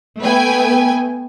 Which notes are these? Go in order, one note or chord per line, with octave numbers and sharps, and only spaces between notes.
A3 B3 B4 G5 G#5